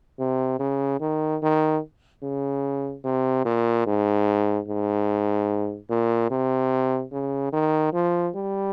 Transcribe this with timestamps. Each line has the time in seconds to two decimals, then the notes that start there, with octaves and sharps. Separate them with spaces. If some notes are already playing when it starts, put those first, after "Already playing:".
0.19 C3
0.59 C#3
1.00 D#3
1.42 D#3
2.22 C#3
3.04 C3
3.45 A#2
3.86 G#2
4.68 G#2
5.90 A#2
6.30 C3
7.12 C#3
7.53 D#3
7.93 F3
8.35 G3